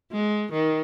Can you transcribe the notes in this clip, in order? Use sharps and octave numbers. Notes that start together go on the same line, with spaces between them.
G#3
D#3